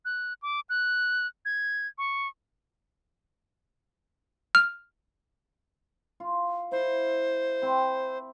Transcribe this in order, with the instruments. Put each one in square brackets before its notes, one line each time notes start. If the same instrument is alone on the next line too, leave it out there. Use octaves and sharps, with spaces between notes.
[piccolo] F#6
D6
F#6
G#6
C#6
[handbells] F6
[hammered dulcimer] F4
[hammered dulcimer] E4 [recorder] C5
[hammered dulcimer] C4 B5